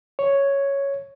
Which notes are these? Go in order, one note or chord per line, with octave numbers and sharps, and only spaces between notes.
C#5